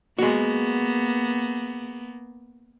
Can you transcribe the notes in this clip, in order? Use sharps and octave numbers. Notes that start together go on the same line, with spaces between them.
G#3 A#3 B3 F#4